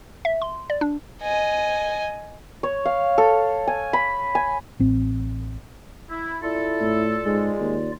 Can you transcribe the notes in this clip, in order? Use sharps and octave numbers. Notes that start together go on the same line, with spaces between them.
E5
C6
D5
D4
D#5 G#5
C#5
F5
A4
G#5
B5
G#5
A1 C4
E4
E4 F4 A4 D5
A2
G#2 G#3
D#2